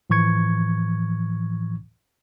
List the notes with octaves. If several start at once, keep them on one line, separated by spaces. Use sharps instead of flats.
A2 E3 F3 C#6 G#6 C#7